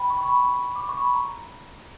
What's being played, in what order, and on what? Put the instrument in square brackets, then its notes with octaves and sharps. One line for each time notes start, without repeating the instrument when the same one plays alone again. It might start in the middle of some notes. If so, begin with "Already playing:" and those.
Already playing: [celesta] G5 B5
C#6
C#6
B5
D6
C#6
B5
A#5